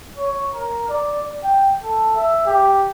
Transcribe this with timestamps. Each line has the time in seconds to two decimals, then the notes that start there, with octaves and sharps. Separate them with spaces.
0.17 C#5
0.54 A#4
0.89 D5
1.44 G5
1.83 A4
2.15 E5
2.46 G4